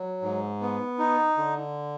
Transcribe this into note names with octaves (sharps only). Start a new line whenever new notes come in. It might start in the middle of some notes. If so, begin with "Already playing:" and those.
Already playing: F#3
G#2
B3
D#4
D3